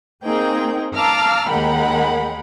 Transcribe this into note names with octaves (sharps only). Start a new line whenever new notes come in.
A#3 C4 D#4 G#4 A#4 G5
F5 A5 A#5 D6 E6 F6
D#2 G#3 A#4 F#5 G5 B5